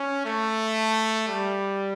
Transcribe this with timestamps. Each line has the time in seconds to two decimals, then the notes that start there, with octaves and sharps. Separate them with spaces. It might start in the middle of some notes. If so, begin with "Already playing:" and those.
Already playing: C#4
0.26 A3
1.28 G3